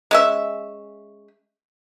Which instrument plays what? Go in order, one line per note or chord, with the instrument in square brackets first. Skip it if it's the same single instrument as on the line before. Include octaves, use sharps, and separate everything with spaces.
[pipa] G#3 C#4 E5